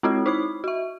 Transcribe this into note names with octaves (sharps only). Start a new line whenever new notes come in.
G#3 C4 E4 F#4
D#4 E4 B5
F#4 E5